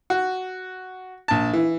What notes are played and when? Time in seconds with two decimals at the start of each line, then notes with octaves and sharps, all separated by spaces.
0.10 F#4
1.28 A#1 A5
1.53 E3